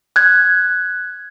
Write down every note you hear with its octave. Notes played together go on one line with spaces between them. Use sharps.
F#6 G#6